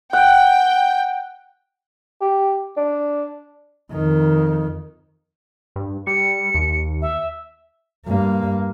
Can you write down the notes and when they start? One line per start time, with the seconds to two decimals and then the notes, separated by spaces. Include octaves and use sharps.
0.13 F#5 G5
2.21 G4
2.77 D4
3.92 F2 D#3
5.76 G2
6.07 G3 C#7
6.54 D#2
7.02 E5
8.07 G2 A#3